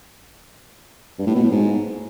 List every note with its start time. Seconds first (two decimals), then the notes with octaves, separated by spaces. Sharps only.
1.18 G2
1.27 A2
1.35 B2
1.43 A2
1.51 G#2